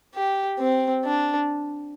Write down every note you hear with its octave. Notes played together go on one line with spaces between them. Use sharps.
G4
C4
D4